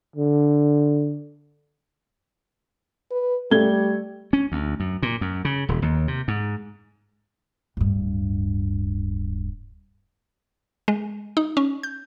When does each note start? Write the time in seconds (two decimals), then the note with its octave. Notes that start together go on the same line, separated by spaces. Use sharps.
0.16 D3
3.11 B4
3.51 G3 A3 G#6 G7
4.33 C#4
4.52 D2
4.80 F#2
5.03 A#2
5.21 F#2
5.45 C#3
5.69 D#1
5.82 D#2
6.08 C3
6.28 G#2
7.77 D1 G2
10.88 G#3
11.37 D#4
11.57 C#4
11.83 G6